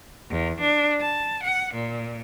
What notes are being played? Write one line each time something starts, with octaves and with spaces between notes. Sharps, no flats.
E2
D4
A5
F#5
A#2